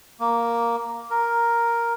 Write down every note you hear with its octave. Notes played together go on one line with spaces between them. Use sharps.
A#3
A#4